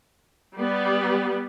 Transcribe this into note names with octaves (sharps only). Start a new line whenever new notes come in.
G3 B3